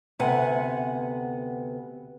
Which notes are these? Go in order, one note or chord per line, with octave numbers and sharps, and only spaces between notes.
D2 C3 B3 F#5 G#5